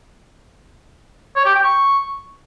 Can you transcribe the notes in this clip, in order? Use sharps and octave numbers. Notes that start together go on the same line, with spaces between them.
C#5
G4
G5
C#6